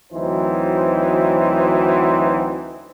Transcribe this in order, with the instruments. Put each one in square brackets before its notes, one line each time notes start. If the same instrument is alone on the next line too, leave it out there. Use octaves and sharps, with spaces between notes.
[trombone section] D2 E3 F#3 C4 D#4 C5